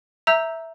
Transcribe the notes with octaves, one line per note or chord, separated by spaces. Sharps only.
E5 A#5 E6 G6